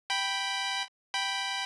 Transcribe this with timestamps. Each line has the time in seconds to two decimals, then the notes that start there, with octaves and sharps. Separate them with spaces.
0.10 G5 B5
1.14 G5 B5